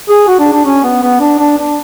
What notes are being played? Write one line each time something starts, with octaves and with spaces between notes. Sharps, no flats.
G#4
F#4
D4
D4
C#4
B3
B3
D4
D4
D4